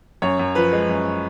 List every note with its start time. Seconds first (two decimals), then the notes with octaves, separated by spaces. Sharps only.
0.22 F#2 C#5
0.39 F#2
0.55 F3 B4
0.73 G#3
0.89 F#2